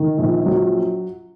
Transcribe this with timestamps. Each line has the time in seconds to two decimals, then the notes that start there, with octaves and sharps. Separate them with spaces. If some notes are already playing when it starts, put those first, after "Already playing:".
Already playing: D#3
0.18 A#1
0.46 F#3